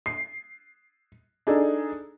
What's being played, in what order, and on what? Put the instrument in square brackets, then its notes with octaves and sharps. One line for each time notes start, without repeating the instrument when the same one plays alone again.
[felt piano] C7
D4 D#4 G#4 A4